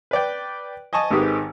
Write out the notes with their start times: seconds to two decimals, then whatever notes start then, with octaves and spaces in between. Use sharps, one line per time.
0.11 B4 D5 G5
0.93 D#5 G#5 A5 C#6 D#6
1.10 G#1 G#2 D#3 G4 B4 D#6